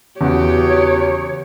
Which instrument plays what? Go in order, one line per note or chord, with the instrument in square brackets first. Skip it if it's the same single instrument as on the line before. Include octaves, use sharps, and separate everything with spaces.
[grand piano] E2 F#4 [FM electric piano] C#3 [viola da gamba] G4 [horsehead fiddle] C#5